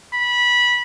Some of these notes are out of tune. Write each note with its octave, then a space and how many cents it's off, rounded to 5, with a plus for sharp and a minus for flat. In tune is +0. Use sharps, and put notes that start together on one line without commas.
B5 -20